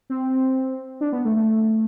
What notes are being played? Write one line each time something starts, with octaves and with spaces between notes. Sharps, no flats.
C4
D4
B3
A3
A3